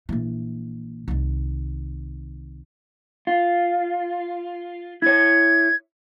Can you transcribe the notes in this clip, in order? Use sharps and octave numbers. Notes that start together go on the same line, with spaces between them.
A#1 E3
C2 D#3
F4
E4 C#5 G#6